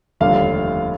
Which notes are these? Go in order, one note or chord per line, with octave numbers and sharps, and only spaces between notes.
F1 D#2 D3 G3 F5